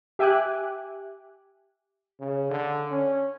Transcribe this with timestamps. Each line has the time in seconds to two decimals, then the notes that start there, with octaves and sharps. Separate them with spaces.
0.19 G4 E5 G5 G#5 D6 F#6
2.20 C#3
2.51 D3
2.91 C#4